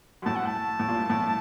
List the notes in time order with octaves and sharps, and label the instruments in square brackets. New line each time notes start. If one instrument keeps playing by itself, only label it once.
[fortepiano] F#2
[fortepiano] A2 [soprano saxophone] A5
[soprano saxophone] F#5
A5
[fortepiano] A2
A#2
A2